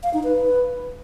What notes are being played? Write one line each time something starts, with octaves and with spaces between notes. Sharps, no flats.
F5
D#4
B4